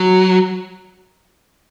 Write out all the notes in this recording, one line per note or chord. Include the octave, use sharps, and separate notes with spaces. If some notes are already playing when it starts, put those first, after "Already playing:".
Already playing: F#3